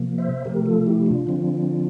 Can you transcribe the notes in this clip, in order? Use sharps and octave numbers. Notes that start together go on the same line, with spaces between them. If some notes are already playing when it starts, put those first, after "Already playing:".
Already playing: C3 F3 A#3
C5 E5
C3 F3 A3 G4 A#4
F4 A4
E4 G4
D4 F4
D3 F3 C4